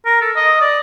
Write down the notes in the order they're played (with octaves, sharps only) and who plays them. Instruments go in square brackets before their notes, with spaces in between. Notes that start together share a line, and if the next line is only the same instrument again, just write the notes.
[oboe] A#4
A4
D#5
D5